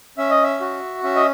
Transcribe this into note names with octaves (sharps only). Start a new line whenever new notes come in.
C#4 E5
D#5
E5
F#4
C#4 E5
D#5